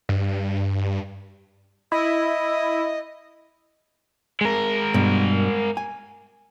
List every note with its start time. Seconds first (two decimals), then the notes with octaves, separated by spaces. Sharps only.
0.09 G2
1.92 E4 D#5
4.41 G#3 A#4
4.94 G2 B2
5.77 G#5